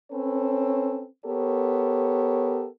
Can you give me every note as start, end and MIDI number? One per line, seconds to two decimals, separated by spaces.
0.12 1.06 60
0.12 1.06 61
0.12 1.06 69
0.12 1.06 71
0.12 1.06 73
1.26 2.67 59
1.26 2.67 67
1.26 2.67 69
1.26 2.67 70
1.26 2.67 73